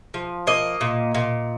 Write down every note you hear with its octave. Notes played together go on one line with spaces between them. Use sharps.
F3
A#3 D#5
A#2
A#2